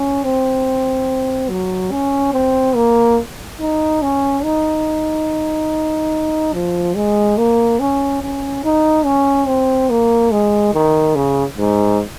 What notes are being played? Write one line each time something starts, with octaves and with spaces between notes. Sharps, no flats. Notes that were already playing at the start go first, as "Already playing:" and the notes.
Already playing: C#4
C4
F#3
C#4
C4
A#3
D#4
C#4
D#4
F3
G#3
A#3
C#4
C#4
D#4
C#4
C4
A#3
G#3
D#3
C#3
G#2